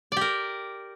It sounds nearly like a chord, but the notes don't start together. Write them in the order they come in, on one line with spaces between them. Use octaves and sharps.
D5 G4 A#4